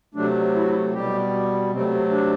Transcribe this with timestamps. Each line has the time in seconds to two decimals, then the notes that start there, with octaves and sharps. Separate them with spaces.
0.15 C3 F#3 A3 D4
0.55 E4
0.62 F#4
0.68 E4
0.93 B2 G3 G4
1.71 C3 F#3 A3 C4
2.10 D4